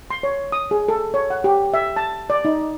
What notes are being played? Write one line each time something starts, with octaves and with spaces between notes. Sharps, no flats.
C6
C#5
D#6
G#4
A4
C#5
F#5
G4
E5
A5
D5
D#4